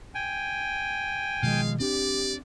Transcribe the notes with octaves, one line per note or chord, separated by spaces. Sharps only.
G5 G#5
B2 D#3 F3 G#3 F5
C4 D4 G4 D5